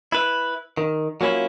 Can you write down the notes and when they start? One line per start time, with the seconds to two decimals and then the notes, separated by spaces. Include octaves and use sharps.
0.12 E4 B4
0.77 D#3
1.21 F#3 A#3 C#4 E4 F4